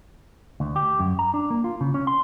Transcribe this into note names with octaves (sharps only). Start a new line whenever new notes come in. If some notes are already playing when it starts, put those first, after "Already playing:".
D2
G4
F#2
A#5
D4
A#3
F4
C#3
C#4
C6